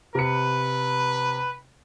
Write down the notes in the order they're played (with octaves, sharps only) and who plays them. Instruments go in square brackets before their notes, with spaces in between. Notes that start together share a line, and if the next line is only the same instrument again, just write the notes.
[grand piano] C3 C#7 [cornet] B4